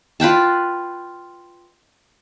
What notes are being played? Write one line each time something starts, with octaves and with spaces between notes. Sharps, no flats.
F4 B4 G5 A5